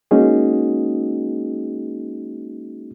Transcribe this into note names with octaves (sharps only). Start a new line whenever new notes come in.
G#3 A#3 C#4 D#4 F#4 G#4